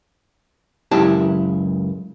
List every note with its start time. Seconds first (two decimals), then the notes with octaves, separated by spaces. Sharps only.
0.91 C#2 F#2 E4 G4 A5